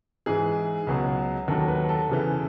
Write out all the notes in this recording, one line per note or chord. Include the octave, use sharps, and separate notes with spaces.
G#2 E3 G#4
C#2 B2 F#3
D#2 D#3 F#3 A4
B4
A4
E2 C#3 E3